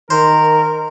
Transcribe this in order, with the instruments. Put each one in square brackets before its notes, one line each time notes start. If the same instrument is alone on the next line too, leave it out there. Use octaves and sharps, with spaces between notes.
[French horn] D#3 [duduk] A#4 [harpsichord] C5